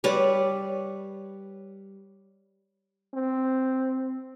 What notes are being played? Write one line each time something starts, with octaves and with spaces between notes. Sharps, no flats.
G3 B4 C#5 D5
C4